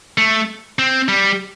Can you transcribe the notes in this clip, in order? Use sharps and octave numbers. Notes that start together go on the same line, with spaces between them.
A3
C4
G3